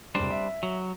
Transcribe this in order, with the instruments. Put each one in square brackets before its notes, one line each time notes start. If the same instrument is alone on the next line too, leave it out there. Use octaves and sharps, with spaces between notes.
[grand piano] F1 C#2 [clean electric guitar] G3 D4 C5
[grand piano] E5
[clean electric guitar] F#3